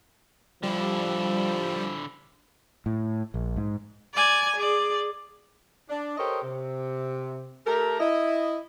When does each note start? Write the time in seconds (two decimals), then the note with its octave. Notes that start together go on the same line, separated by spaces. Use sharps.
0.63 D3 F3 G3 E4
2.86 A2
3.34 A#1
3.57 G#2
4.14 D5 G#5
4.56 G#4 D5
5.88 D4
6.17 G4 A4 A#4 C5 C#5 D#5
6.42 C3
7.65 A3 G4 A4 A#4
7.99 E4 D#5